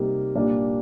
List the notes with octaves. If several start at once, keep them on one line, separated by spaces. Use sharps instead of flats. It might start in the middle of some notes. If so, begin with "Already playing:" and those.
Already playing: C3 G3 A#3 D#4
A#2 G3 A#3 D4